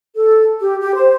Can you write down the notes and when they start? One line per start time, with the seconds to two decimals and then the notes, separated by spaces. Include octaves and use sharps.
0.15 A4
0.59 G4
0.80 G4
0.95 C5